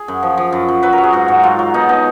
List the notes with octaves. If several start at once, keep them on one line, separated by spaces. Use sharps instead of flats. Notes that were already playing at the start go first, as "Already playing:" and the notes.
Already playing: G#4
F#2
F3
F3
F#2
F#2
F#3 B4
A#4
F#3
G#4
G#2 F#4
G#2
F#3 F4
F#3
B2 D#4
B2 D#4